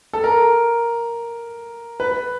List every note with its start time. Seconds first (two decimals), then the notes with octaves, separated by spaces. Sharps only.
0.13 A4
0.24 A#4
2.00 B4